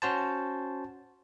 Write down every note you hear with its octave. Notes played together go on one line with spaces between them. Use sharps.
C#4 F#4 C5 A5